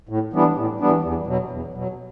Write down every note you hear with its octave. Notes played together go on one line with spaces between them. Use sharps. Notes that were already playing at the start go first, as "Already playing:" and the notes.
A2
E3 G3 B3 D4
A2
E3 G3 B3 D4
E2
B2 F#3
E2
B2 F#3